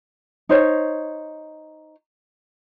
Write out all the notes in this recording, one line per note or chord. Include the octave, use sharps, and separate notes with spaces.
D#4 C5 C#5